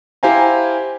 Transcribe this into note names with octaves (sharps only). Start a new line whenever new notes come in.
E4 G4 C5 F5 G#5 A#5